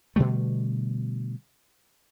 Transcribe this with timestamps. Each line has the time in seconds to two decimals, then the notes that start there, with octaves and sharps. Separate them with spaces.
0.16 B2 D3 G3 A3